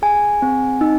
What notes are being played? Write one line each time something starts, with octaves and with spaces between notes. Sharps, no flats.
G#4 G#5
C4
D#4